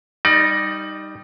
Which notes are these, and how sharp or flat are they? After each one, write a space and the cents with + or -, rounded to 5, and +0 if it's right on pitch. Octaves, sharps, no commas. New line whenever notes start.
G3 +0 D#4 +0 D5 +30